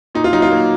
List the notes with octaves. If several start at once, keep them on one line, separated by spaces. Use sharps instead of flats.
A#2 D#4
F4
F#3 D#4
F4
A#3